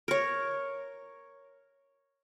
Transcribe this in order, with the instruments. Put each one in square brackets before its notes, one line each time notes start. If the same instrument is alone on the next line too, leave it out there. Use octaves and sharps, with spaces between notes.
[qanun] A#4 C#5